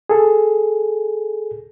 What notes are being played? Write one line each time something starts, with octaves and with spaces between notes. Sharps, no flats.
G#4 A4